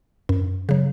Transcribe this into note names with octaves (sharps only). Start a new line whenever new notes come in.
F#2
C#3 F#3